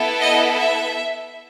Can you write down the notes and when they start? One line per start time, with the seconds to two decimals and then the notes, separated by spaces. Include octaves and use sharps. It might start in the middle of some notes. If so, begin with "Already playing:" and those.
Already playing: B3 E4 A4
0.21 D#5
0.57 E5